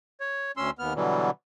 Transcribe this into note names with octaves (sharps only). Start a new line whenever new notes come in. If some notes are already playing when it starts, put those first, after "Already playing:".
C#5
D2 C#4 C6 E6
D#2 B3 F6
B2 D3 E3 F#3 G3